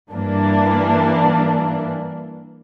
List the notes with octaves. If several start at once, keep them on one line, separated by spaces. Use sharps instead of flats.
G2 E3 A#3 D4